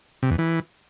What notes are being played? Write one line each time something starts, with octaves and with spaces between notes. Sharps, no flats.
C3
E2
E3